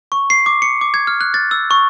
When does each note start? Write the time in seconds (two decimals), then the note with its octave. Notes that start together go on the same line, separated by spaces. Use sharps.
0.12 C#6
0.30 C7
0.46 D6
0.62 C#7
0.81 D6
0.94 G#6
1.07 F6
1.21 F#6
1.34 A6
1.51 E6
1.71 C#6